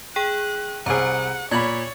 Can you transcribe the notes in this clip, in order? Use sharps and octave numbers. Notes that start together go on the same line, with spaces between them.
G#4 G5 F#6 D#7
C2 G#4 C5 F#5 A#5
A#2 C#5 B5 G#6 A6 F#7